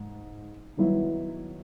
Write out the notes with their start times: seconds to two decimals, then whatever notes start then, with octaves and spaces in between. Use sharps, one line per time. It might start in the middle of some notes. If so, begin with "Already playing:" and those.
Already playing: G#2
0.77 D#3 F#3 B3 E4